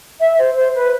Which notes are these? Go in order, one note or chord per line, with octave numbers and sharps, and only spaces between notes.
E5
C5
C5
B4